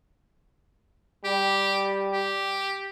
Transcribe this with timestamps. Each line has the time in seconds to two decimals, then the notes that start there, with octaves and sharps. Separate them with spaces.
1.25 G3 G4
2.13 G4